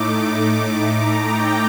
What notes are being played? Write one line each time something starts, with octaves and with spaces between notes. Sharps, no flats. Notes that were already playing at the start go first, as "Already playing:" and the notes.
Already playing: A2 A3 D#4 D6
A#5
G5